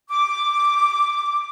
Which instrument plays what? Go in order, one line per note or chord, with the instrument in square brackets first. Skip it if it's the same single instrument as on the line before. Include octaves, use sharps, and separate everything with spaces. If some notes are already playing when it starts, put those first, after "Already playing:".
[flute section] D6